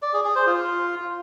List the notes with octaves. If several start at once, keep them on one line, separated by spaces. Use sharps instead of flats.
D5
G#4
G#4
C5
F4